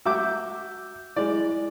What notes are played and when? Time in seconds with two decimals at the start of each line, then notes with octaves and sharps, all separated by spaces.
0.06 F#4 E5 D6 E6 G6
1.16 G#3 E4 D5